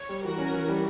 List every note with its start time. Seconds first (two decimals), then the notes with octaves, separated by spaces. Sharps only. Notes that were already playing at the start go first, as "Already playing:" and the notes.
Already playing: C#5
0.09 G3
0.24 E3 F#4 A#4
0.38 C#4
0.54 E3
0.68 G3